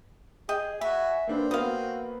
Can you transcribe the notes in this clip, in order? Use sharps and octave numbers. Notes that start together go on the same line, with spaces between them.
G#4 D#5 G5
F#4 E5 G#5 B5
A#3 C4 D4 B4
A#3 B3 F#4 B4 F5 D#6